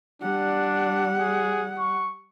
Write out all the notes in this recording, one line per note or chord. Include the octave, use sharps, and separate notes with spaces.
G3 D4 F#5
G#4
C#6